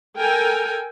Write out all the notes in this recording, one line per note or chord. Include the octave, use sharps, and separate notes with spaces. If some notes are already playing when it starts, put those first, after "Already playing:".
A4 A#4 G5 G#5